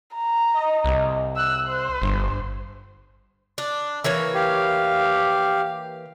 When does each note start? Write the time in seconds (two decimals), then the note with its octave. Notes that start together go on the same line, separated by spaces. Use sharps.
0.14 A#5
0.54 D#5
0.85 C2
1.37 E6 F#6
1.69 C5
2.02 G1 G2
3.58 D4
4.04 E3 A#3 C#5
4.34 G4 F5